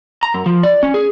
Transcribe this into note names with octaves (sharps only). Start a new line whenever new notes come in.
A#5
F#2
F3
D5
C#4
G#4